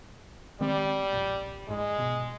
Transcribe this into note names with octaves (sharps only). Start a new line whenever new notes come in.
D#3 G3 G#3 C4
F1 A#1
G1 G#2 G#3
B2